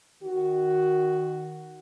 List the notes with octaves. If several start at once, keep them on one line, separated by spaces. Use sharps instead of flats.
D#3 F#4